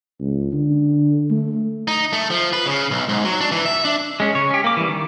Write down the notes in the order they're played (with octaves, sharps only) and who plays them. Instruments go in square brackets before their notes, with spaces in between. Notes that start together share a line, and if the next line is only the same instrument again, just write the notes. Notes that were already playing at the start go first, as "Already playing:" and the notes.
[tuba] C#2
D3
A3
[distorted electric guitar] D#4
A3
F3
B4
C#3
B1
G#2
F#3
D4
E3
E5
D4
[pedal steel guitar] G#3 C#4
C#3 C#5
C#4 G4
A#3 D6
E3 G3
D#3